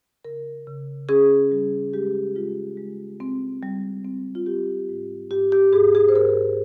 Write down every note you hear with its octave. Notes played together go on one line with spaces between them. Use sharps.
C#3 A#4
C#3
C#4 G#4
G3
G#3 G4
G#3 F4
G#3
C4
G3
C4
F4
C4 G4
G#2
G#2 G4
G4
G#2 G#4
G#4
C5
G#2 A#4